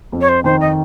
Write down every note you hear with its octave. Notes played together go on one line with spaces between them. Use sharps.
F2
C#5
C5
D#3 C5
D#5